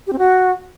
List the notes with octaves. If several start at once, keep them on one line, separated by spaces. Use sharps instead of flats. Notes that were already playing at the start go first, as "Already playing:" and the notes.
G4
C4
F#4